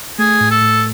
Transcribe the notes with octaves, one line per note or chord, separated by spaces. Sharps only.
A3 G#4
A2
A4
A2